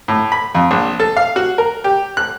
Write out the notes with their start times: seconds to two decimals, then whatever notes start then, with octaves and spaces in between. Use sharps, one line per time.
0.08 A2
0.32 B5
0.55 F2
0.71 A#1
1.00 A4
1.17 F5
1.36 F#4
1.58 A#4
1.84 G4
2.17 F#6